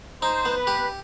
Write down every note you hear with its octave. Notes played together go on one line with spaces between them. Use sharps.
D#4 C5
B3
B4
G4